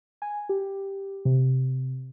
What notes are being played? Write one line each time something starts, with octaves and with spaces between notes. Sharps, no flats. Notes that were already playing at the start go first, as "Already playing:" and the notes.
G#5
G4
C3